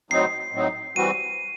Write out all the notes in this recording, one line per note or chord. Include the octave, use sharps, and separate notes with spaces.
A2 F#3 C4 D#4 C7
A2 F#3 C4 D#4
E3 G3 C4 F#4 D#7